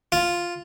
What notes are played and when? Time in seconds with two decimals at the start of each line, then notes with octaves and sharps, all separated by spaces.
0.12 F4